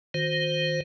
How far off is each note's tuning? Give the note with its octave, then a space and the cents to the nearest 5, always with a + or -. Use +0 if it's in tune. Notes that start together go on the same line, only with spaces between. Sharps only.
D#3 +0 F#4 -40 C5 +0